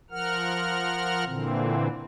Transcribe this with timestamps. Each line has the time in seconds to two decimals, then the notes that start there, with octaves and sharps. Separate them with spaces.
0.10 F3 A#4 F#5 F6
1.25 A#2 D3 E3 C4